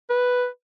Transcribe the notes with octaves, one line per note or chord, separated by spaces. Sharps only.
B4